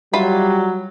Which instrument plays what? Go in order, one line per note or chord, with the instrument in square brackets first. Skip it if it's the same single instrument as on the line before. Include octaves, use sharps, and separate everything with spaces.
[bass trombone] F#3 [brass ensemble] G3 [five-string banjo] F4 E5 B5